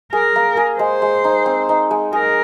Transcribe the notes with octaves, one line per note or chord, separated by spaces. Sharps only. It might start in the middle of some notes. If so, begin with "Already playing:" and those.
G#4 A#4
A#3
G#4
G#3 C5
G#3
D#4
C4
D#4
G#3
G#4 A#4